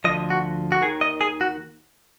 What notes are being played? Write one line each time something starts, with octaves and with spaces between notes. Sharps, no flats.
D2 D3 F3 D#5
F#4
F#4
D#2 D#3 G#4
D#5
G#4
F#4